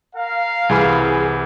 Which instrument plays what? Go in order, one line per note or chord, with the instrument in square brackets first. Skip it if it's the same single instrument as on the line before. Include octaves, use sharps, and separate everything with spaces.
[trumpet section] A#4 F5
[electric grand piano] C2 E3 B5 [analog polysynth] G#4